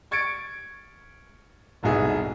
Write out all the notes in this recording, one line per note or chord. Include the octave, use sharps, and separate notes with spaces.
C#6 G#6 A6 C#7 D7
F1 C2 G#2 B2 G#4 E5